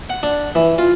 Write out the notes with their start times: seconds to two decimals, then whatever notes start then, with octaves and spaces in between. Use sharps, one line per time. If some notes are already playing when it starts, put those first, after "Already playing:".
0.10 F#5
0.23 D4
0.55 E3
0.78 F4